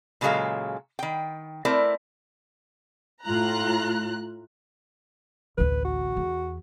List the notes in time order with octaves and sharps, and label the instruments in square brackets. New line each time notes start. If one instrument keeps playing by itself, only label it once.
[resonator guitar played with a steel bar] A#2 C#3 F#3 G#3 A4 F5
D#3 G5
A3 C4 E4 A#4 D5
[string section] A2 F4 A#5 F#6
[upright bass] A1 D2 [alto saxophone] B4
[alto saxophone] F#4
[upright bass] E2